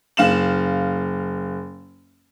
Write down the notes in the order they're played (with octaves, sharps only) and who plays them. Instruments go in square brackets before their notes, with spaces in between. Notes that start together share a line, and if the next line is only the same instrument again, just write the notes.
[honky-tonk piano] F#1 F5 E7 F#7